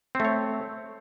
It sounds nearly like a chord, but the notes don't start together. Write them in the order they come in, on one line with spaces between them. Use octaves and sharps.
C4 A3 C#5